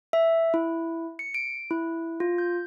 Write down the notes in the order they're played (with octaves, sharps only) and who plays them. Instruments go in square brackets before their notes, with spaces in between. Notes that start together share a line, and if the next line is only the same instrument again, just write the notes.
[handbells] E5
E4
C#7
D7
E4
F4
G6